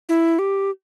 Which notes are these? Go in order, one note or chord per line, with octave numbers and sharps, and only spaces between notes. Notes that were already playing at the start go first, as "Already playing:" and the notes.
E4
G4